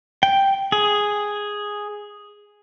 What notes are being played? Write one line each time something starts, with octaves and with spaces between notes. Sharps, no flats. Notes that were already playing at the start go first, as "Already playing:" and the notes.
G5
G#4